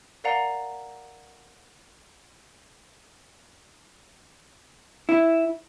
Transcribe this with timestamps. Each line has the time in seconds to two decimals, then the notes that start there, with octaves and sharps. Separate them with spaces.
0.24 A#4 D5 F5 F#5 A#5
5.09 E4